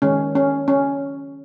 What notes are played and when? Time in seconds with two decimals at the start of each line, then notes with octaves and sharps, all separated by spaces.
0.02 D#3 G#3 C#4
0.35 C#4
0.68 C#4